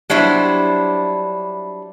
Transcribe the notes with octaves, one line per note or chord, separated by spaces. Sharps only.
F#3 G3 D4 E4 C5